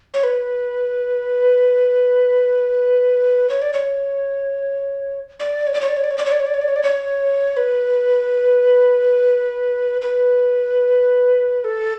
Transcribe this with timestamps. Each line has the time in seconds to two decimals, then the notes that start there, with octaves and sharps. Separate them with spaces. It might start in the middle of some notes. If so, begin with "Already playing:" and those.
0.14 C#5
0.24 B4
3.49 C#5
3.62 D5
3.74 C#5
5.40 D5
5.67 C#5
5.74 D5
5.81 C#5
5.88 D5
5.97 C#5
6.04 D5
6.11 C#5
6.18 D5
6.26 C#5
6.32 D5
6.40 C#5
6.46 D5
6.54 C#5
6.61 D5
6.68 C#5
6.76 D5
6.83 C#5
7.57 B4
10.02 B4
11.64 A4